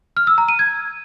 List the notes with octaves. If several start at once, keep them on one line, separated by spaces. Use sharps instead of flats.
F6
E6
A#5
D#7
G#6